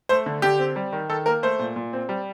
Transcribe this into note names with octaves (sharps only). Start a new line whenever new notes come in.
A3 C5
D3
D3 G4
C4
G3
D#3
D#3 A4
A#3 A#4
A3 C5
A#2
A#2
C4
G3